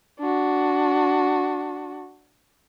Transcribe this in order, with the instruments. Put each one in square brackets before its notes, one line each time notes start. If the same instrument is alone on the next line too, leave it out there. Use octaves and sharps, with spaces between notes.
[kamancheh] D4 F#4